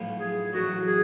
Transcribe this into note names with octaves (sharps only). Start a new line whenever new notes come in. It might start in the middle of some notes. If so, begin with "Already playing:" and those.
Already playing: B1 A2 F3 B3 F4
G#4
A1 A2 F#3 F#4
G#4